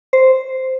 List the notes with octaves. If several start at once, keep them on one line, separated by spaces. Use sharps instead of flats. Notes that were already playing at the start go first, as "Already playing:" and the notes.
C5